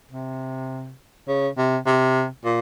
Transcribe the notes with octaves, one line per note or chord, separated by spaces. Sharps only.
C3
C#3
C3
C3
A#2